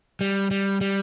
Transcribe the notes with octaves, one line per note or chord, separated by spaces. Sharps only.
G3
G3
G3